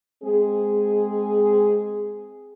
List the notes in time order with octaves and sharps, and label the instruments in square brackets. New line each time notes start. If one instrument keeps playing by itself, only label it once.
[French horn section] G#3 C4 G#4